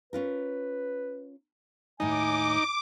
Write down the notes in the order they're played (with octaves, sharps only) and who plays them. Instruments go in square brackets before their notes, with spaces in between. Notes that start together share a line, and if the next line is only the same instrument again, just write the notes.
[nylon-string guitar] C#4 F4 A#4 [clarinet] B4
[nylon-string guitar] D#2 A2 [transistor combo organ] D#4 [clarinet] G#5 [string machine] D6